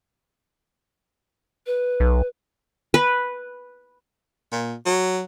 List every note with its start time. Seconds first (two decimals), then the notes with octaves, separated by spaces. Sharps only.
1.66 B4
2.00 B1
2.94 B4
4.52 A#2
4.86 F#3